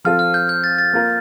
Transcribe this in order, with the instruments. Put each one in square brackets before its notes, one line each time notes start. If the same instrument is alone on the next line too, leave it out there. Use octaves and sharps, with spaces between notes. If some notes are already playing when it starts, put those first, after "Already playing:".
[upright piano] F3 C4 F4 A4 [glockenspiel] F6
[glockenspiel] F6
G6
G6
A6
A6
[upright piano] A#3 F4 A#4